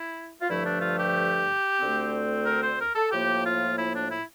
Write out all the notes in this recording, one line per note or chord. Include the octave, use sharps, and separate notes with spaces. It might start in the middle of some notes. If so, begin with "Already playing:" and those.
Already playing: E4
F4
G2 D3 F3 A3 E4
D4
F4
G4
D2 D3 A3 C4
A#4
C5
A#4
A4
A2 F3 A#3 G4
F4
E4
D4
E4